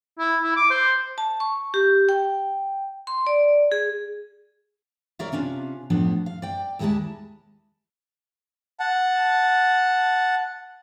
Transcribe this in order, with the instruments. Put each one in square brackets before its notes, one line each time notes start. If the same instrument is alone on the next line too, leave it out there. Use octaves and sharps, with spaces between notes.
[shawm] E4
E4
D6
C5
[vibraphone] A5
C#6
G4
G5
C6
D5
G#4
[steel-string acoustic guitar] A#4 C#5 D5 E5 F5
C3 C#4 D4 F4
A2 F3 B3 D4
F5
D5 G5
D#2 G3 G#3 E4 G#4 A5
[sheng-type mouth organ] F#5 A5